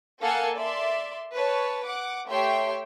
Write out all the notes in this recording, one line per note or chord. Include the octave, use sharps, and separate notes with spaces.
A#3 A4 F5 F#5 G#5 C#7
D5 E5 C6
B4 C#5 A5
F#5 D6
A3 G4 C#5 E5 G5 C6